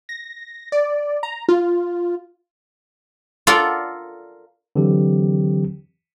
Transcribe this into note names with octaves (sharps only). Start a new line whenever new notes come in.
A#6
D5
A#5
F4
F4 A4 A#4 D5 F#5
D3 E3 F#3 C4 G4